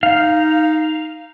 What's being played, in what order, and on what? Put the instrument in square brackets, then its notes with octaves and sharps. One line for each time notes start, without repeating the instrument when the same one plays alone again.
[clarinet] D#4 [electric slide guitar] F5